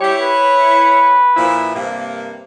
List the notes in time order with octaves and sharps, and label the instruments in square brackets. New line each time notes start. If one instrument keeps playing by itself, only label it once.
[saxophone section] E4 C#5 [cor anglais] G4
[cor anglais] B4
[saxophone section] A#2 F3 E4
G2 C3 A#3